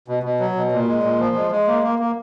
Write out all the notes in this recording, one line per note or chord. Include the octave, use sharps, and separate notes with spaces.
B2
B2
F#3
B2
A#2
G#3
A#2
F3
G#3
G#3
A#3
A#3
A#3